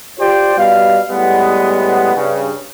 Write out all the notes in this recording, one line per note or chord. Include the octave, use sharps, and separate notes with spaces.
F4 G4 C5 D5 G5
B2 G3 F5
A2 G3 G#3 B3
G2 C#3